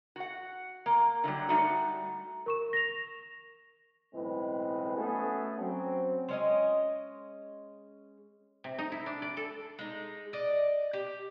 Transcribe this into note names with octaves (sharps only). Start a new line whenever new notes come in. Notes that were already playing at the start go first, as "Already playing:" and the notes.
F#4 F#5
A#3
D3 E3 F#3 G3
G3 A3 D#4 F#4
A#4 C#6 E7
A#6 F7
B1 A2 E3 G#3 C4 B4
A3 B3 C#4 F#4 G#4 A4
F#3 C4 C#4
G#3 C#4 D#5
C3
D#4
E4
D4
D5
A4
G#3 D#4
D5 D#5
G4